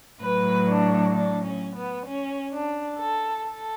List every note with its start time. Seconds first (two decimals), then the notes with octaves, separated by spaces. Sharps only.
0.22 A2 F#3 B4
0.68 D4
1.14 D4
1.45 C#4
1.76 B3
2.06 C#4
2.52 D4
2.99 A4
3.45 A4